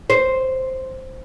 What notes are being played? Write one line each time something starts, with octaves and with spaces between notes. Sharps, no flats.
C5